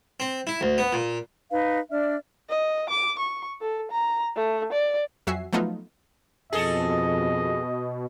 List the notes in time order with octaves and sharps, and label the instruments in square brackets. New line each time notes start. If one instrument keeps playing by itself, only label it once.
[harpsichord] C4
E4
D2
B3
A#2
[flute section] D#4 B4 F5
D4 D5 E5 F6
[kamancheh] D#5
D6
C#6
A4
A#5
A3
D5
[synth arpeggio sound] F2 F#3 F#4 E5 G#5 C7
F3 F#3 A3 B3 D#4 F4
[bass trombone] F2 [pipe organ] B2 [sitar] G#4 A4 [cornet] D#5